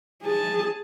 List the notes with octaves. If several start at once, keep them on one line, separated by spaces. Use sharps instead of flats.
G#4 A5